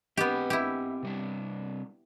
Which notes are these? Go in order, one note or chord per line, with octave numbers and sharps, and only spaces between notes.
B3 C4 G4 A#4 D#5
E4 G4
C3 G3 D4